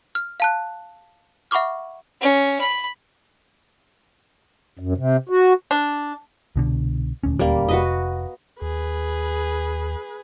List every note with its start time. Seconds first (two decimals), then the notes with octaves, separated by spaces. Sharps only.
0.15 F6
0.40 F5 A5 F#6
1.51 E5 F#5 B5 C#6 D6 F6
2.22 C#4
2.61 B5
4.79 F#2
4.97 C3
5.29 F#4
5.71 D4
6.56 C2 B2 D3
7.23 D#1 D2 C#4
7.39 G3 A#3
7.69 F1 F#4 B4 D#5
8.62 D#2 G#4 B4